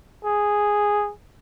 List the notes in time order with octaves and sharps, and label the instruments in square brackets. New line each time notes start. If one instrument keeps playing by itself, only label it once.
[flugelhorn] G#4